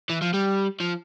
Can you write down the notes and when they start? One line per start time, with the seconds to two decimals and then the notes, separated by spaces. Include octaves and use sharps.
0.10 E3
0.22 F3
0.34 G3
0.80 F3